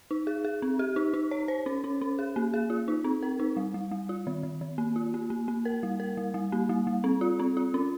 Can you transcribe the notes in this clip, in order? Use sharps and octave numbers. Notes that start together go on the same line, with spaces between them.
D#4
G#4
G#4
C4
G4
D#4
D#4
C#5
C5
C#4
C#4
C#4
G#4
A#3
G#4
F4
D#4
C4
A#4
D#4
G3
G3
G3
F4
D#3
D#3
D#3
A#3
F4
A#3
A#3
A#3
A#4
G3
A#4
G3
G3
A#3
G3
G3
C4
F4
C4
F4
C#4